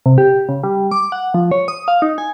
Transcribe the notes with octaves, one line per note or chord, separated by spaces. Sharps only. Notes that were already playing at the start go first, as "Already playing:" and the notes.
C3
G4
C#3
G3
D6
F#5
F3
C#5
D#6
F5
D#4
G#5